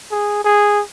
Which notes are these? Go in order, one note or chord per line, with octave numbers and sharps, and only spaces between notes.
G#4
G#4